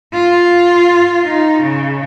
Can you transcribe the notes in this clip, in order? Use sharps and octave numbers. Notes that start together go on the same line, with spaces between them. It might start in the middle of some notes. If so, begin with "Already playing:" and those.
F4
D#4
C#3